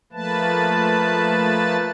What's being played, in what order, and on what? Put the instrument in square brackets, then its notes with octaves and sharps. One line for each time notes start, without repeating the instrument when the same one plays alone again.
[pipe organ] F3 A3 A#3 B4 A5